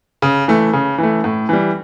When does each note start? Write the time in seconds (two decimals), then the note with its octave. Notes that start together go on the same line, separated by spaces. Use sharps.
0.22 C#3
0.48 E3 A3
0.73 C#3
0.98 E3 A3
1.24 A2
1.49 E3 G3